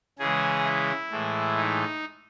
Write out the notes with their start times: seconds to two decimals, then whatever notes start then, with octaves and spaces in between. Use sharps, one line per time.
0.19 C#3 E3 G#3 G#4
0.65 E4
1.11 A2 E3 G#3
1.57 D#4